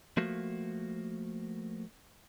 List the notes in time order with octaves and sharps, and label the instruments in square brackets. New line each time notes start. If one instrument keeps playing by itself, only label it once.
[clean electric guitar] F3 A3 A#3 F#4